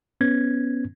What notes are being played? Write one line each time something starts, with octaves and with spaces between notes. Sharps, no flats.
B3 C#4 G#6